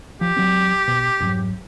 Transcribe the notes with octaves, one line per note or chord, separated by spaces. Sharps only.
F3 G4
F#3 C4
B2
F2 G#2 F#3